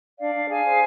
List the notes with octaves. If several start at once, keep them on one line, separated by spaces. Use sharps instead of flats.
D4 D5 F5
D4
G#4 F5 G#5
C5